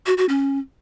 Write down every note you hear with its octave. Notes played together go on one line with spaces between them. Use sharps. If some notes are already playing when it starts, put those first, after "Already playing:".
F#4
F#4
C#4